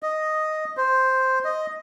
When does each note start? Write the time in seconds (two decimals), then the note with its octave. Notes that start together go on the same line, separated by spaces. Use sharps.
0.03 D#5
0.77 C5
1.45 D#5